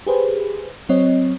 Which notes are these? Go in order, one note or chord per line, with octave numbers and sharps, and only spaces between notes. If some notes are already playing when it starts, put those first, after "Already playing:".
G4 G#4 B4 C5
F#3 C4 C#5 D#5